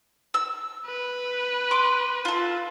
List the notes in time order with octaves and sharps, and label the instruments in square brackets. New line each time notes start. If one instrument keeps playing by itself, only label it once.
[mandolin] E6
[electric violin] B4
[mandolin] C6 D6
F4 A4